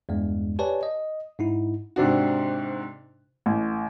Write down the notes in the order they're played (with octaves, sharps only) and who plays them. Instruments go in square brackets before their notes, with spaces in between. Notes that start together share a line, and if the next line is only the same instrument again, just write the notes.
[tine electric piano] E2 G2 G#3
G4 B4 C#5 D5 G#5 A5
D#5
G#2 D#4 E4
[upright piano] G#2 C3 D4 F#4
[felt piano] A1